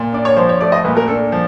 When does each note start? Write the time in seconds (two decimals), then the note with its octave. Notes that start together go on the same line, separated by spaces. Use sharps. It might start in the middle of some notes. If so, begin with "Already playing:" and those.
Already playing: A#2
0.12 D4 D5
0.25 C#5
0.36 F3 C5
0.49 C#5
0.60 A3 D5
0.72 D#5
0.84 A#2 B4
0.97 A#4
1.08 D4 A4
1.32 F3